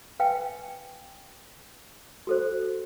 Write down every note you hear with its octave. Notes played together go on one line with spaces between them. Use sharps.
B4 F5 G5 G#5
F#4 A4 C5